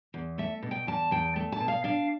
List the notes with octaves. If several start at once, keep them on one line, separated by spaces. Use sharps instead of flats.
E2
A3 E5
B2
G5
E2 A5
E2 G5
A3
A5
B2
F5
D4 F5